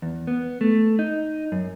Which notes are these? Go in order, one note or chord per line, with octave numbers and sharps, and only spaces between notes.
E2
B3
A3
D#4
F#2